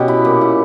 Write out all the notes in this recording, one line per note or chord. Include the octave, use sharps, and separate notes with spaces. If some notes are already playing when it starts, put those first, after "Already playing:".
Already playing: B2 B3 C#4 G4
E4
A#2
E4